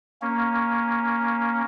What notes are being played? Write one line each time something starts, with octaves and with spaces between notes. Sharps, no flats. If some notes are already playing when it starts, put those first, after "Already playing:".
A#3 C#4